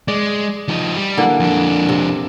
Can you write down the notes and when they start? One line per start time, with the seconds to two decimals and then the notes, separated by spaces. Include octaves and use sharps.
0.08 G#3 D5
0.68 F3 D#4
0.97 G3
1.17 D3 E3 A#3
1.40 F2 D4
1.89 C3